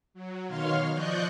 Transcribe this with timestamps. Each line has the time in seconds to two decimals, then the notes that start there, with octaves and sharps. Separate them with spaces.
0.14 F#3
0.48 B2 D#3 C#5 F5 C6 F6
0.92 F3 D5 D#5 C#6 F#6 G6